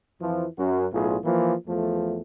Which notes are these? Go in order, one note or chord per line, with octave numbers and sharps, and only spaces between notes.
F2 E3 F3
F#2 F#4
B1 A2 F4 G#4
E3 F3 A#3
E2 F3 A3